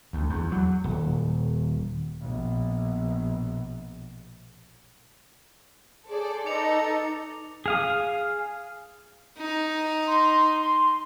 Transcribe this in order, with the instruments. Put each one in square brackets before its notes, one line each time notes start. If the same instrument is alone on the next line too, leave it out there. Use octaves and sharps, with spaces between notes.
[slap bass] D2
E2
F#3
D#1
[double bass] A#1 B2
[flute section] G#4 D6 [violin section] A4 C5 D5
[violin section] D#4 [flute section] A4 B4 D#5 [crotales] D6 C#7 F7
[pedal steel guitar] G#4 F5 D#6
[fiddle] D#4
[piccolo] C6